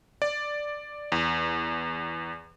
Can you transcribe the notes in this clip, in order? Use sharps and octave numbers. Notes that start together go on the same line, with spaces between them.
D5
E2